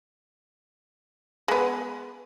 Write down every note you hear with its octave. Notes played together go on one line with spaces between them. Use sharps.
G#3 B3